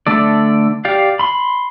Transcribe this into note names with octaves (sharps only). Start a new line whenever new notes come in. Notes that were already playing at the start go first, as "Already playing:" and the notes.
D3 A3 A4 D5
G4 D5 F5
B5 C6